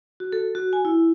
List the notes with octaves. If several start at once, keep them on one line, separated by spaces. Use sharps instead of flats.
F#4
A4
F#4
G#5
E4